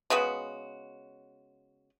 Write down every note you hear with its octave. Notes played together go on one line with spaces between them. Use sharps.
C#3 G#3 B3 F#4